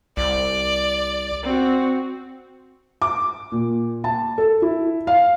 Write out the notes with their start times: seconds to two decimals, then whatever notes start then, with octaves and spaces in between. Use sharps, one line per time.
0.17 C2 D5
1.43 C4 F#4
3.02 D6
3.52 A#2
4.04 A5
4.38 A4
4.62 E4
5.07 F5